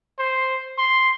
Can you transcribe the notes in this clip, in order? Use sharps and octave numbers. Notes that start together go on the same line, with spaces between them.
C5
C6